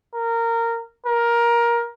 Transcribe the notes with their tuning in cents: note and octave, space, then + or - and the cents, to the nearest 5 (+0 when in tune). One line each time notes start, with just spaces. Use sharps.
A#4 -15
A#4 +15